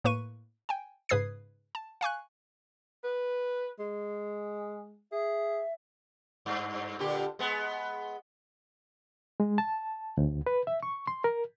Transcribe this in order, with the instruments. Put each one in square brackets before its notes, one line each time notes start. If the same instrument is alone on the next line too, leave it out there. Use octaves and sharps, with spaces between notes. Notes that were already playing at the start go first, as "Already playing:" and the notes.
[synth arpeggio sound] A2 A#3 B4 C#6 D#7
G5 G#5
G#2 C#3 B4 D#6 G#6 C7
A5
F5 G#5 C#6 F#6
[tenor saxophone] B4
G#3
[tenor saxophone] G#4 [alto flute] E5
[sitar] G2
A#2 D3 G4
G#3 B3
[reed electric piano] G#3
A5
D2
B4
E5
C#6
C6
A#4